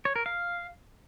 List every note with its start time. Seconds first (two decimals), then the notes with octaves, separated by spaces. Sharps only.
0.05 C#5
0.16 A#4
0.26 F5